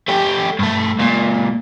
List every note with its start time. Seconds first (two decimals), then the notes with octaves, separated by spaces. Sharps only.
0.08 A3 G4
0.59 G2 A3
0.99 C#2 A#2